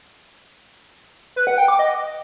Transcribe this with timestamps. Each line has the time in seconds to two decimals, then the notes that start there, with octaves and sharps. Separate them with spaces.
1.36 B4
1.47 F#5
1.58 G5
1.68 D6
1.79 D#5